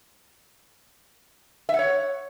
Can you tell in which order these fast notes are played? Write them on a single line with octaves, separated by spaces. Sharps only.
E5 F#5 C#5